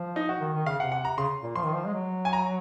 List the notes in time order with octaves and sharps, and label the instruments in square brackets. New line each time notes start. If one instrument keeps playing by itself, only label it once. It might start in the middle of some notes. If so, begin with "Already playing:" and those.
Already playing: [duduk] F3
[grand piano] D#4
F#4
[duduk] D#3
D#3
[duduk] C#3 [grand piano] F5
[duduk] C3 [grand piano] F#5
[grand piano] F#5
A#5
[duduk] C#3 [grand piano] C6
[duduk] A#2
[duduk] F3 [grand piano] C6
[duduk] D#3
F3
G#3
F#3
[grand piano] G#5
A#5